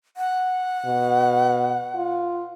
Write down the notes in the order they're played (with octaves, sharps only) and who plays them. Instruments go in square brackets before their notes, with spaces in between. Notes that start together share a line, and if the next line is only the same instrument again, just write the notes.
[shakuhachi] F#5
[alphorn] B2
F4